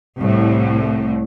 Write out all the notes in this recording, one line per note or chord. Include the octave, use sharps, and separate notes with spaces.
C2 A2